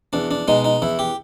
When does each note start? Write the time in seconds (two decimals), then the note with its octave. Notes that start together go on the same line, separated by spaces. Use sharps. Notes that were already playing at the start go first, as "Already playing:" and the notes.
0.13 E2 D4
0.31 D4
0.48 B2 G#3 D#4
0.65 D#4
0.82 E2 E4
0.99 G4